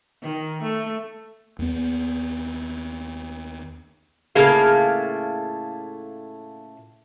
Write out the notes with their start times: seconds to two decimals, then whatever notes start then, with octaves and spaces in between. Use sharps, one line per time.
0.23 D#3
0.63 A3
1.59 D#2 B3
4.35 A2 C#3 A3 A#3 F4 G#4